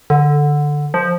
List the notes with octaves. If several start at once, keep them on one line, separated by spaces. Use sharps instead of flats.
D3
F3